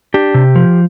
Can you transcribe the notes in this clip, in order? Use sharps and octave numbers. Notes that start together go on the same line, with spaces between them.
D4 G4
C3
F3